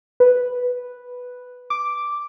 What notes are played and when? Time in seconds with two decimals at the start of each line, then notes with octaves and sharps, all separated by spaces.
0.20 B4
1.70 D6